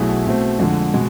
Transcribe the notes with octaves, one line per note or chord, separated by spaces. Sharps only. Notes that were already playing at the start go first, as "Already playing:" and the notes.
Already playing: B1 B2 A3 E4 G#4
B2 A3 C4
F2 D3 G#3
B2 G#3